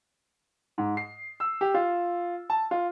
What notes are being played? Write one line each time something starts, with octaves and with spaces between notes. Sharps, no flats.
G#2
C7
E6
G4
F4
A5
F4